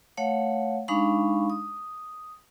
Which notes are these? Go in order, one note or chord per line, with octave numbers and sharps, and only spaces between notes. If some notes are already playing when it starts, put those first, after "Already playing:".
A3 C#5 F5 F#5
G#3 D4 D#4 F5 B5 C#6
D#6